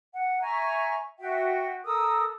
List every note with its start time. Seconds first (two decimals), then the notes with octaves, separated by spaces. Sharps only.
0.14 F#5
0.41 E5 G#5 A#5 C#6
1.19 F#4 E5 G5
1.85 A4 A#4 D#6 E6